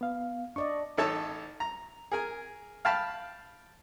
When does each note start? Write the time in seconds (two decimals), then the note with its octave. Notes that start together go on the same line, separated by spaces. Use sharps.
0.01 B3 F5
0.56 D4 D5 D#5 C#6
0.97 A1 D#4 A4 C#5 A5
1.60 A#5
2.12 G#4 A#4 G#5
2.85 F5 G5 A5 B5 F6